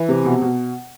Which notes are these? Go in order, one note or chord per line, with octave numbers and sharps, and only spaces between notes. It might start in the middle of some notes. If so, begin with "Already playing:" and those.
Already playing: E3
C3
B2
B2